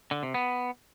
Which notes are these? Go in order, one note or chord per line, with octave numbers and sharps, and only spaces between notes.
D3
C3
B3